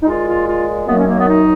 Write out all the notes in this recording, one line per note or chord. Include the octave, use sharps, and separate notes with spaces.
D#4
A#2 G#3 F4
F4
F4
F#2 D#3 F#3 A#3 B3
C#4
A#3
B3
D#4